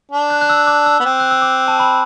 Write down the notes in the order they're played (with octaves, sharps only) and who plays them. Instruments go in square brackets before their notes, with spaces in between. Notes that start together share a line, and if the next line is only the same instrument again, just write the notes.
[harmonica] D4
[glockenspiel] F#6
F#6
E6
D6
E6
[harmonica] B3
C4
[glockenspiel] F#6
E6
D6
A5
B5